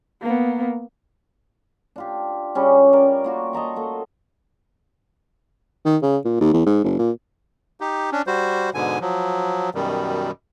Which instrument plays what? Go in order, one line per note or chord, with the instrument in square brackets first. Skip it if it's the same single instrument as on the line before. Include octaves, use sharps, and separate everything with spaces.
[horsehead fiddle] A#3 B3
[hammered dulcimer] D4 F4 G4
C#3 G3 C#4
A#4 D5 D6
A#3 F4 F#4
D#5 A5 A#5 C#6
A#3 A4
[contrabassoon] D#3
C#3
A#2
D#2
E2
G#2
F#1
A#2
[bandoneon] D#4 G4
C#4 D4
G3 F#4 C5
G#2 B2 D3 G#5
F3 F#3
F#2 B2 D#3 G3